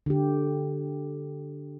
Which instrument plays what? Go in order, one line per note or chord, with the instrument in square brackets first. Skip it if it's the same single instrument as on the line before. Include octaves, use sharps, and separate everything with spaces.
[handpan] D3 G4